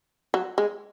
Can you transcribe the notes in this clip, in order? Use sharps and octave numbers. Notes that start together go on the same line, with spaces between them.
F#3
G#3